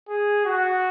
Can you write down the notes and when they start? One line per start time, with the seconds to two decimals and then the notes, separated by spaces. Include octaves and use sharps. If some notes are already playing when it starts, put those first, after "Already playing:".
0.08 G#4
0.46 F#4